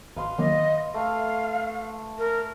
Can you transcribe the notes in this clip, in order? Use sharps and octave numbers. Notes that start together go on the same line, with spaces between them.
G#1 B4 F5 C6
D#3 F#3 A#3 D#5
A3 F5
A#4